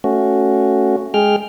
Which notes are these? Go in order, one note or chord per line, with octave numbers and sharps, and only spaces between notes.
A3 C#4 F#4
G#3 G#4 G5 F6